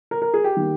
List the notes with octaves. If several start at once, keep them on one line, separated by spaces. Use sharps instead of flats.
A#4
A#4
G#4
G4
D#3 A#3